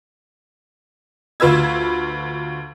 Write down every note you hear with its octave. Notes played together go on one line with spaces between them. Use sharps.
D2 F4 B4 E6 G#6